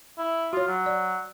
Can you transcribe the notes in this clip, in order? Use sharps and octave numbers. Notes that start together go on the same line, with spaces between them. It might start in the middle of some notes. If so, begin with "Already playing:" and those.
E4
F4 F#4 C#5
F#3
D5